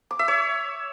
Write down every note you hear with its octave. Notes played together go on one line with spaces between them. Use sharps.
D6
E5
C#5